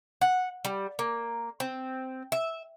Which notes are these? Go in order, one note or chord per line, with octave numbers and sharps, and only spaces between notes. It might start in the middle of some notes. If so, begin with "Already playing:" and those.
F#5
G3
A#3
C4
E5